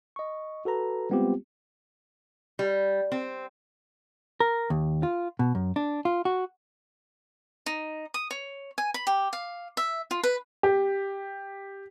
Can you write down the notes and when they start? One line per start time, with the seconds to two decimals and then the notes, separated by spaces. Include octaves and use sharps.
0.16 D#5 C#6
0.65 F#4 A4 B4 A#5
1.10 G3 G#3 B3 C4 F4 G4
2.59 G3
3.12 C4
4.40 A#4
4.70 D#2
5.03 F4
5.39 B2
5.55 F#2
5.76 D4
6.05 F4
6.25 F#4
7.66 D#4
8.14 D#6
8.31 C#5
8.78 G#5
8.94 B5
9.07 G4
9.33 F5
9.77 E5
10.11 F4
10.23 B4
10.63 G4